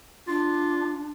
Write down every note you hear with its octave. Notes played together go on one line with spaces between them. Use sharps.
D4 F4